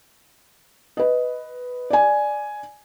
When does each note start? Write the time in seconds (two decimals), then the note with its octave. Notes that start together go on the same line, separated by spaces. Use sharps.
0.97 B4 D#5
1.90 D5 G#5